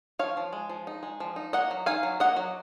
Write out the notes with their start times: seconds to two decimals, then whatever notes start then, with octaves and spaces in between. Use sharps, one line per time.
0.19 F3 C#5 F5
0.37 F3
0.53 G#3
0.70 F3
0.87 D#4
1.03 G#3
1.20 F3
1.36 D#4
1.53 A#3 D#5 F#5
1.71 F#3
1.86 D#4 F5 G#5
2.03 F#3
2.20 A#3 D#5 F#5
2.37 F#3